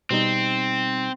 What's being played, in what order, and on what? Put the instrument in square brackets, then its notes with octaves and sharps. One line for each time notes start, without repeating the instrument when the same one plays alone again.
[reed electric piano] B2 G3 D#4 [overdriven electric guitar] C4